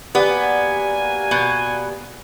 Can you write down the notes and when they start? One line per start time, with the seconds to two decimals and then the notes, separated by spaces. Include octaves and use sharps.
0.15 A#3 B3 F#4 G4 D5 F#5 G#5
1.31 B2